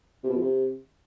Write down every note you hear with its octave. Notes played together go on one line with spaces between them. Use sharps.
C3
B2
F2
C3